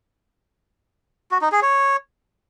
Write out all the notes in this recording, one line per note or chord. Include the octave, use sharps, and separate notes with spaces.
F#4
D#4
G#4
C#5